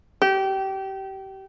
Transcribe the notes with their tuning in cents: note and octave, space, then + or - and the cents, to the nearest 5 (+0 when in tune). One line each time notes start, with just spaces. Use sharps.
G4 -25